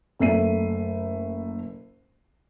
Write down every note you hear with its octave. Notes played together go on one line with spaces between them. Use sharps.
F#1 A3 E5 C7 D#7